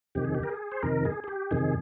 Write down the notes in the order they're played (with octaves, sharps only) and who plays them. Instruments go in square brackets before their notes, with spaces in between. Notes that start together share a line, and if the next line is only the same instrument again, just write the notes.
[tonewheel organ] F2 C3 D#3 G4
G#4
G4
A#4
G#4
C5
F2 C3 D#3 A#4
G#4
G#4
G4
F2 C3 D#3 G#4